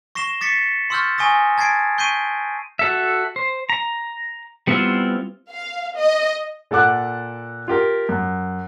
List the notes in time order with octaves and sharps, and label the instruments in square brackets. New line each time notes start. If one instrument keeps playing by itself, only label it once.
[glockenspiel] C#6 A#6 C7 E7 G7
D6 A6 B6 C#7
C6 C#6 E6 F6 G6 A6
G#5 C#6 D#6 A#6
A5 G#6 A6 C7 D7
C#6 G6 B6 C7 D7 D#7
[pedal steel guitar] F#4 A4 E5
C5
A#5
G3 B3 C4 E4 F4
[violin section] F5
D#5
[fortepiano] A#2 A4 F#5 D6 F#6
F4 G4 A#4
F#2